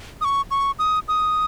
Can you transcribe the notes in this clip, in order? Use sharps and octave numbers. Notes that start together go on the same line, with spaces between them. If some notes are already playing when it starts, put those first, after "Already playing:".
D#6
C#6
C#6
D#6
D#6